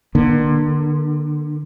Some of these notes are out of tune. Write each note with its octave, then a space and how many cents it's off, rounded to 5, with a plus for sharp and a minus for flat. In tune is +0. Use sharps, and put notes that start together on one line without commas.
D3 +30 A#3 +40